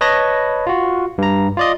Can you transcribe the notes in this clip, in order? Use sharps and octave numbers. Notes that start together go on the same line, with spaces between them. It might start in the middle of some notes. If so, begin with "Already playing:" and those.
B4 C#5 D#5 A5 B5 A#6
F4 F#4
G2 A#5
F4 D5 D#5